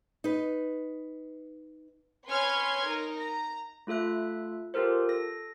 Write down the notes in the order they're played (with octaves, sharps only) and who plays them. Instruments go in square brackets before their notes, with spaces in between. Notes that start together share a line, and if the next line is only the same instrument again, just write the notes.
[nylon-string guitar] D#4 B4
[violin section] C#4 B4 C#5 C6 F6 G#6
D#4 A#4
A#5
[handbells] A3 F4 A4 E5 F#6
F4 G4 A4 A#4 C5
A4 A#6